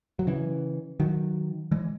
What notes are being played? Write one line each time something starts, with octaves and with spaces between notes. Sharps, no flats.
F#3
C#3 E3
D#3 F#3
E3 G#3